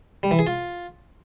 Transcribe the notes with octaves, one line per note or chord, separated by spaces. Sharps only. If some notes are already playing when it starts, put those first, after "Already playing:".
G3
E3
G#4
F4